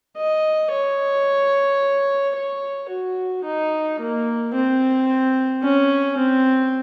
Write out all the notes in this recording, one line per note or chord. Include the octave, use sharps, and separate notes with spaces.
D#5
C#5
C#5
F#4
D#4
A#3
C4
C#4
C4